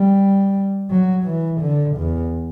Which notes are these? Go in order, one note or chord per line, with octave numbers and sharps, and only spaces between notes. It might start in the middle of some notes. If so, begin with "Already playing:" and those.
Already playing: G3
F#3
E3
D3
E2